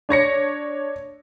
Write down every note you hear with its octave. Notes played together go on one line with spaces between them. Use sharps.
D4 C#5 A#6 C#7